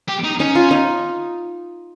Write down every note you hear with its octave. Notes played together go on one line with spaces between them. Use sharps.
G4
D#4
C#4 D#4
F4
D#4